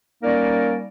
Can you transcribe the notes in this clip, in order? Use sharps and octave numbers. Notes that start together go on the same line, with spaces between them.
G3 A#3 C#4 D#4 A#4 D5